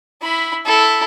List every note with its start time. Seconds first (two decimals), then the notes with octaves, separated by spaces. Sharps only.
0.22 E4 B5
0.66 E4 A4